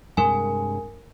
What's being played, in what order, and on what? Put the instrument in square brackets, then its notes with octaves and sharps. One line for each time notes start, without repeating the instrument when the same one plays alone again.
[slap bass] G2 C3 G#3 [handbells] A#4 G#5